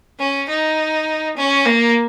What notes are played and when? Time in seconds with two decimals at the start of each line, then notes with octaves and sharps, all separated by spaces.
0.19 C#4
0.49 D#4
1.36 C#4
1.65 A#3